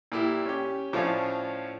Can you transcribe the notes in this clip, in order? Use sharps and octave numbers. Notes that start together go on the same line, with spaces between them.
A#2 E4 G4
C#4 G4
A2 F3 C#4 D4 F4 F5